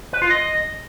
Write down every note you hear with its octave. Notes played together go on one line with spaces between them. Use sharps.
B4
F4
D#5